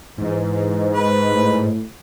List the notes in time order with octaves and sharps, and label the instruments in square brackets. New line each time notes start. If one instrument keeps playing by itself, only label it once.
[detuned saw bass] G#2 [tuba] E3
[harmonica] B4
[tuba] A2